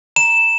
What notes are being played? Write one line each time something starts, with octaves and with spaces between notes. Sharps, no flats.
A#5 E7